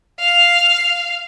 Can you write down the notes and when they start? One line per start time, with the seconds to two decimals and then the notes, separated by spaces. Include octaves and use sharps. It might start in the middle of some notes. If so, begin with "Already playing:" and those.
0.20 F5